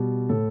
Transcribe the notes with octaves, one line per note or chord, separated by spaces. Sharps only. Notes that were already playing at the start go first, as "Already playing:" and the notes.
Already playing: B2 G3
A2 A4